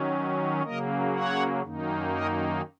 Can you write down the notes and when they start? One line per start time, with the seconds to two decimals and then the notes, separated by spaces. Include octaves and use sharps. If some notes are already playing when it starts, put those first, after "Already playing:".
Already playing: D#3 F#3 C#4
0.63 C#3 F#3 A#3 A#4 D#5
1.13 C#5 F#5
1.62 F#2 D#3 A#3 D#4
2.12 A#4 D#5